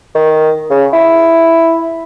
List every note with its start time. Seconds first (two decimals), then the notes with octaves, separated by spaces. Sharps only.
0.15 D#3
0.70 C#3
0.93 E4